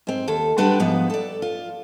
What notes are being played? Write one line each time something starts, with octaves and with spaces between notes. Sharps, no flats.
G#2 C4
D#2 A4
G3 C4 D4 B4 F#5
G#2 F3 B3
A4 D5
F4